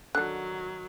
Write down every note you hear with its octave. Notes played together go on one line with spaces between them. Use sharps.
D3 D#3 F#3 D4 F#6